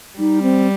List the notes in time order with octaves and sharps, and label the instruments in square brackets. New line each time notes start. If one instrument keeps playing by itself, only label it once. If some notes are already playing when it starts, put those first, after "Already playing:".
[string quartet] G3 [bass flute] D#4
[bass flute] C4